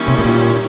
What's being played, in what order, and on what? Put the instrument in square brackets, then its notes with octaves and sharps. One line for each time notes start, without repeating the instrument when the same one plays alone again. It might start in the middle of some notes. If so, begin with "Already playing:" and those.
Already playing: [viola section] D#3 G3 A#3 C#4 E4
[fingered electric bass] C3
A2
A#2